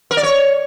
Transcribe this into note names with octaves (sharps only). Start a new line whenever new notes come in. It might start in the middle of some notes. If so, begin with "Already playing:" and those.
A#4
D5
C#5